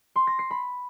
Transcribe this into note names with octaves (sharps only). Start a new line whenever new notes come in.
C6
A#6
C7
B5